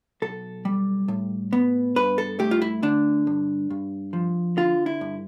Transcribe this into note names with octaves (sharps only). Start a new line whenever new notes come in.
B1 A4
G3
A2
B3
G2 B4
A4
A3 G4
F4
E4
D3 D4
G2
G2
F3
D3 F4
E4
G2